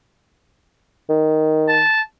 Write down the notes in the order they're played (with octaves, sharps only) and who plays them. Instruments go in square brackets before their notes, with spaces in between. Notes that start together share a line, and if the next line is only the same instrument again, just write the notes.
[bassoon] D#3
[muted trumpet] A5